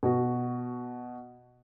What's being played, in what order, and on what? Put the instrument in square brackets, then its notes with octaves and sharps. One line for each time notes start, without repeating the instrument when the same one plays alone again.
[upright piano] B2 F#4